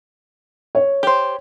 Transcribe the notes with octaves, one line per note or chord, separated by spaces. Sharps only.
C#5
G4 C5